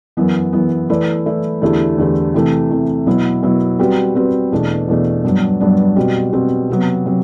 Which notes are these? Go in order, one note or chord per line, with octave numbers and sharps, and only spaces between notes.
F#2 E3 B3
F#2 E3 B3
E3 A3 E4 B4 D5
E3 A3 E4 B4 D5
E2 D3 A3 E4 G4
E2 D3 A3 E4 G4
C3 E3 A3
C3 E3 A3
B2 F#3 B3 E4
B2 F#3 B3 E4
G3 C4 F#4 B4
G3 C4 F#4 B4
E2 B2 A3 D4
E2 B2 A3 D4
G2 F#3 B3 D4
G2 F#3 B3 D4
B2 G3 C4 F#4
B2 G3 C4 F#4
C3 F#3 B3
C3 F#3